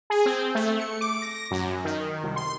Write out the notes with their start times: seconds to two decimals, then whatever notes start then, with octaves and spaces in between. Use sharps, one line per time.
0.10 G#4
0.26 C4
0.55 A3
0.80 C#7
1.01 D6
1.22 A#6
1.51 F#2
1.85 D#3
2.24 C2
2.36 C6